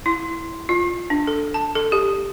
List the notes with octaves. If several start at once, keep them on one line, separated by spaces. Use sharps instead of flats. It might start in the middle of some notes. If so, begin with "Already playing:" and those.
E4
F4
D4
A4
A5
A4
G4